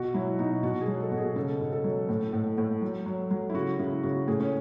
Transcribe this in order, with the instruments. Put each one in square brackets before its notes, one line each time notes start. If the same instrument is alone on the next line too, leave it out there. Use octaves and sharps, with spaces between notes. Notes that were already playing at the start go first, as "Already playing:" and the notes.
Already playing: [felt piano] B2 F#4
F#3 E4
B2 D#4
B2 F#4
G#4
F#3
A4
B2
G#4
C#3 A4
C#3
A4
F#3
A2
A2
A2
F#3
F#3
F#3
E4
C#3 F#4
C#3 E4
C#3 F#4
A2 G#4
C#4